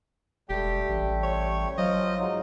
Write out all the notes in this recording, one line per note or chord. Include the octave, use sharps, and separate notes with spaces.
E1 G3 A3 G4 G5
A1
C#5
F#3 F4 C5 D#5
G#2 F#3 D#4